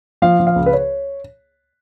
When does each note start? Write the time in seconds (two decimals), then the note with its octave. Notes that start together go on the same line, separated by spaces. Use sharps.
0.22 F3 F5
0.40 F3
0.47 F5
0.56 C#2
0.66 B4
0.73 C#5